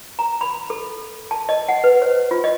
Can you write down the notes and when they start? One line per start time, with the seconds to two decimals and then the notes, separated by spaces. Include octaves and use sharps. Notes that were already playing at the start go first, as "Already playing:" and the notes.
0.19 A#5
0.41 B5
0.70 A4
1.31 A5
1.49 D#5
1.69 F#5
1.84 B4
2.02 C5
2.31 F4
2.44 D#5